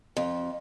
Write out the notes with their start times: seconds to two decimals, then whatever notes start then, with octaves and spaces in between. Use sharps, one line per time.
0.17 F2